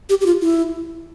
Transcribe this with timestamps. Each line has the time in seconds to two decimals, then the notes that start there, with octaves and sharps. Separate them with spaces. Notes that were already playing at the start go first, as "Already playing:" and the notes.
0.10 G4
0.21 G4
0.26 F4
0.42 E4